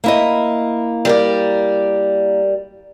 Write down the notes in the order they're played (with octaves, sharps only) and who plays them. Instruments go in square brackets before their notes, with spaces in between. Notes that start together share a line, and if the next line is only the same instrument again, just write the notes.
[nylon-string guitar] A#3 E4 D#5
[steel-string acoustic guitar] G3 A#4 D5